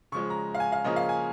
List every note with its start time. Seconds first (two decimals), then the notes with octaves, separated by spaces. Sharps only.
0.12 C#3 F3 G#3 C#6
0.30 A#5
0.55 F5
0.60 G#5
0.72 F5
0.84 C#3 F3 A#3 C#4 D#5
0.96 F5
1.09 G#5